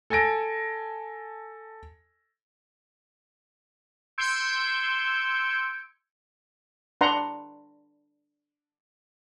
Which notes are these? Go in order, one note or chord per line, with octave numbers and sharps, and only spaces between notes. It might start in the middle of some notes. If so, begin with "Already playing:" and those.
A4 G#5 A5 A#6 D7
C6 E6 G6 G#6 C#7 D7
D4 B4 F#5 A#5 C6